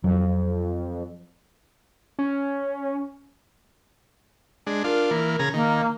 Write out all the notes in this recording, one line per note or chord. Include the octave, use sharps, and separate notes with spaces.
F2 F#3
C#4
G#3 D4
D4 F4 A#4
E3 A#3
C#3 G#4 A#5
D#3 A#3